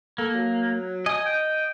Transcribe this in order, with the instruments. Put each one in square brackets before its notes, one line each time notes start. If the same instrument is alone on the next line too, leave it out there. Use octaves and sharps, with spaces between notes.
[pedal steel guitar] A#3 [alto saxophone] A4
[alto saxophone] F#3
[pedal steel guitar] D#5 D#6 [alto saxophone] G#5
[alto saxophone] G5